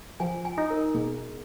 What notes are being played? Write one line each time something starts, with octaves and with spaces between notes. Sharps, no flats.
F3 G#5
G#5
D#4
A#4
B2 G#4